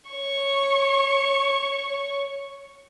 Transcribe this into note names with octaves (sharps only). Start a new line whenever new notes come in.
C#5 C#6